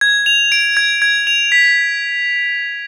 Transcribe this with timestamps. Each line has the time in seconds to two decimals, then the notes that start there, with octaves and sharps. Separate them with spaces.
0.01 G#6
0.26 F7
0.52 D7
0.77 G#6
1.02 G#6
1.27 F7
1.52 B6